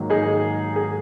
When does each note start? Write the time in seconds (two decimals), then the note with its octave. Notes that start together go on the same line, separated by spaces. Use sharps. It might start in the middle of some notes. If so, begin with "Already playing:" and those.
Already playing: G#2 D#3 F#3 A#3
0.10 D#4 G#4
0.76 G#4